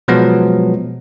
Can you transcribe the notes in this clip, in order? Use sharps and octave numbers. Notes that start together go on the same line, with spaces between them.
B2 F3 F#3 G#3 B3